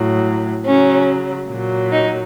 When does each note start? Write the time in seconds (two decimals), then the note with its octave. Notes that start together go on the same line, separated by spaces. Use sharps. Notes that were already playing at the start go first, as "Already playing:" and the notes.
Already playing: A2 F#3
0.66 C#3 F#3 C#4
1.50 A#2 F#3
1.92 D#4